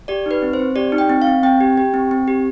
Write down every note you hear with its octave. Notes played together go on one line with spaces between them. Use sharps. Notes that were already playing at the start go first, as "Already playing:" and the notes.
G4 D5
D#4 B4
C4
C5
C4
G4 D5
D#4
G5
C4
F5
C4
C4 G5
G4
G4
C4
C4
G4